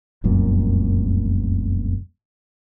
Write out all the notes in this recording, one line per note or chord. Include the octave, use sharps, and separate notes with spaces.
F1 C2 F#2 A#2